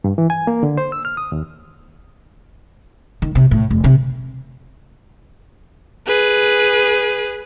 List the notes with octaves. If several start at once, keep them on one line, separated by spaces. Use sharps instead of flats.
G2
E3
G#5
A#3
D3
C5
E6
F6
D#6
D#2
D#3
C3
A2
F1
C3
G#4 B4